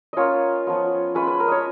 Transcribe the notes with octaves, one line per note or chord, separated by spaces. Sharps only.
A#3 C#4 F4 C#5 D#5
F3 B3 F4
G#3 C#4 F4 B4
B4
A#4
C#5 D#5